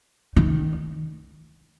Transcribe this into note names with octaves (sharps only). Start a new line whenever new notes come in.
D#3